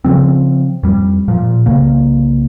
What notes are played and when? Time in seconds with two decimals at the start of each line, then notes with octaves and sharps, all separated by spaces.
0.04 C#3 F3 C4
0.83 F2 G3
1.28 A#2 F3
1.66 C2 C#3 A#3